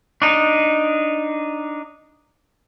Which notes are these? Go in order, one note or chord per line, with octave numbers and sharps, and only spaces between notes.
D4 D#4